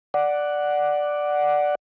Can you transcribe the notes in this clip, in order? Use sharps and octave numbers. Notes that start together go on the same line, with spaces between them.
D5 F#5